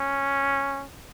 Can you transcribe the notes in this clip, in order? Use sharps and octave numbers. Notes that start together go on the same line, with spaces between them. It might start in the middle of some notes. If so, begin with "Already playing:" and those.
Already playing: C#4